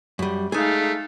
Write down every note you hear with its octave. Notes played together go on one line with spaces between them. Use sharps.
F#2 G3
G#3 A3 D#4 G#4 F5